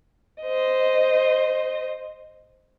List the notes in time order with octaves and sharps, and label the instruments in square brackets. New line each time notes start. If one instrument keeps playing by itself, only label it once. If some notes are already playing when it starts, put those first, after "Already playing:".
[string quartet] C5 D#5